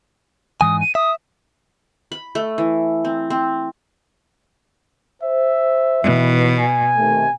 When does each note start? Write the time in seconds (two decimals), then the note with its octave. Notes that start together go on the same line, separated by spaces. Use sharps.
0.61 G#2 E3 G#5 D#6
0.81 D#7
0.95 E5 D#6
2.12 B5
2.35 A3
2.58 E3
3.05 C4
3.30 C4
5.23 C5 E5
6.03 D#2 B2 E3
6.59 G#5
6.97 C3 D#3 A3